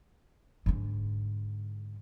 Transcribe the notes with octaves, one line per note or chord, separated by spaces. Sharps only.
G#2 D3